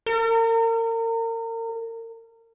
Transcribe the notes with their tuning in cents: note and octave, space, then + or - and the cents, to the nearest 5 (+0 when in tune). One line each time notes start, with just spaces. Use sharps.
A#4 -35